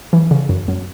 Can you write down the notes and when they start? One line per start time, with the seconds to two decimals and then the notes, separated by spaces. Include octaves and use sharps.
0.13 E3
0.31 C#3
0.49 F#2
0.68 F#2